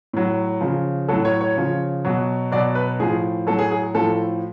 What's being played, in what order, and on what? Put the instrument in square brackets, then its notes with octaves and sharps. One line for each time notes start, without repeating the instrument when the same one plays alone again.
[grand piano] A2 F#3
C#3 F3
A2 F#3 A4
C#5
C#5
C#3 F3
B2 F#3
B2 F#3 D5
B4
A2 F3 G#4
A2 F#3 A4
G#4
G#4
A2 F3 A4